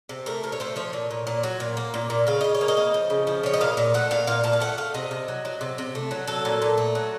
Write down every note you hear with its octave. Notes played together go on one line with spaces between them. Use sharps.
C3
A3 A#4
C3 A#4
C#5
A3 C5
F3 C#5
A#2
A#2
A#2
F#3
A#2
A#3
A#2
A#2
C#3 F5
C#3 D#5
C#5
A#3
D#5
A#3
F3
C#3
F3
C#3 C#5
D#5
A#2 F5
A#2
A3 F#5
A#2 F5
A#2 F5
A#2 A5
F5
A3 F#5
A3 F5
C3 D#5
C3
F#3
F#3
C3
C3
A3
F#3
F#3 A4
A#2
A#2
A3
F#3